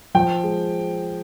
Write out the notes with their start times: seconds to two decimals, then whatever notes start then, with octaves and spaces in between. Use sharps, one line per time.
0.15 F3 G5
0.44 G#3